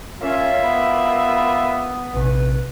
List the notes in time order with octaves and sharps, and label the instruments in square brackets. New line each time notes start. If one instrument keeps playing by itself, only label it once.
[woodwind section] A#3 F4 E5 [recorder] C#4 [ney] C#5
[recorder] B3 [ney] B5
[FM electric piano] A#1 C3 [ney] B4